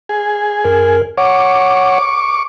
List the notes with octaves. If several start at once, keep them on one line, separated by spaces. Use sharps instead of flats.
G#4
F#2 A#4
C#5 F#5 C#6 D6